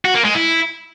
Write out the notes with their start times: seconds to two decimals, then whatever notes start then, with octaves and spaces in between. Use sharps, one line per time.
0.05 F#4
0.15 A#3
0.25 G#3
0.35 E4